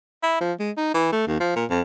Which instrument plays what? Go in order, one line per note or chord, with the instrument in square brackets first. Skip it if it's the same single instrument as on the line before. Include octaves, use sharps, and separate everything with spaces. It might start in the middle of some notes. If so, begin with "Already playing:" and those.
[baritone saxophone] E4
F3
G#3
D#4
E3
A3
D#2
F3
A#2
F2